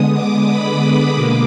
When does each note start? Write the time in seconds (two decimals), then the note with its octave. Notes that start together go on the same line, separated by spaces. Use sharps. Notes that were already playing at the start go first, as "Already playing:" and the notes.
Already playing: D3 G#3 B3 D#6
0.15 D6
0.48 B5
1.14 B2 A#3 D6